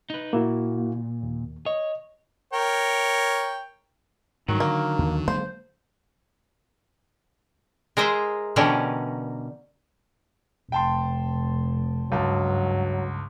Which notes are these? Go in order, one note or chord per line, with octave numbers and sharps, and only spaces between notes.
D#4 B4
A#2 A#3 E4 F#4
D#2
C#5 D#5
A#4 C#5 G5
G#2 D#3 F#3 G3
D3 A#3
D#2
F#3 G#3 A#3 C5
G#3 A#4 C5 D#5 E5
B2 D3 E3 G3 C#4 A#4
F1 G5 A5 C6
C#2 G2 F#3 A5